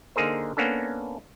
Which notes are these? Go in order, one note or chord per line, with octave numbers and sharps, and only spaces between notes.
D3 A#3 D#4 G#4 A#4 C5
A#3 B3 C#4 D4 A4